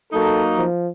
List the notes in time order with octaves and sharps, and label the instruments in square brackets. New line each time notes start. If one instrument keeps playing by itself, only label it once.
[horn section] F#3 A#3 D#4 [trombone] A4
[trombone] F3